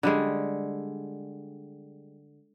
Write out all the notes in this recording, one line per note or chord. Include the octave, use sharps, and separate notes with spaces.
D3 G3 G#3